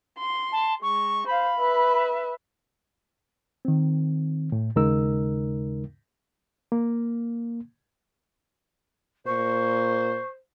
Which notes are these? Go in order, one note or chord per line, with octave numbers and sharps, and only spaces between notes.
C6
A5
G#3 C#6
C5 F5 B5
B4 E5
D#3 C4
A2
D#2 C#3 G#3 D#4 A#4 E6
A#3
A#2 C5 C#6